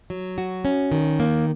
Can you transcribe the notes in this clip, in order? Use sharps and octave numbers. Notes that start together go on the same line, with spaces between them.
F#3
F#4
C#4
D#3
A#3